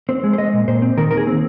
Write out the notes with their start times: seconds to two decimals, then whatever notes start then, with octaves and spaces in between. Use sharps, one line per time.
0.09 C4 C5
0.24 G#3
0.33 C5
0.38 G#3 D#5
0.53 A#2
0.68 A#2 C5
0.82 C4
0.97 D#3 A#4
1.11 D#2 A#4
1.17 G#4
1.27 C4